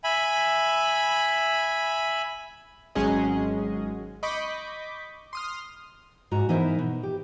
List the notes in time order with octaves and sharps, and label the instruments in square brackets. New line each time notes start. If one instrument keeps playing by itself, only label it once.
[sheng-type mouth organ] E5 G#5 B5
[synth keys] G#1 F#3 G#3 C#4 G#4 D#5
D#5 B5 C#6 D6 G6 B6
C6 D#6 F6
[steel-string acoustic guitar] G#2 F#4 G#5 A#5
E3 B3 D#4 E4 A#4 C5
B2
G4